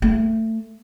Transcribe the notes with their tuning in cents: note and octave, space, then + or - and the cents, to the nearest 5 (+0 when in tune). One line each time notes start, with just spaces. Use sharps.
A3 +20